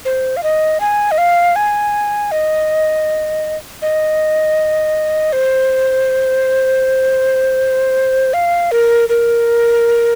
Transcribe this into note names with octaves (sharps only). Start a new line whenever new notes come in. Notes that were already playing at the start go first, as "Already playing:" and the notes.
C5
F5
D#5
G#5
D#5
F5
G#5
D#5
D#5
C5
F5
A#4
A#4